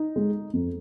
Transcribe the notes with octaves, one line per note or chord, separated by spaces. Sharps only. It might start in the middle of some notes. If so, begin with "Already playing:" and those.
Already playing: D#4
G#3
F2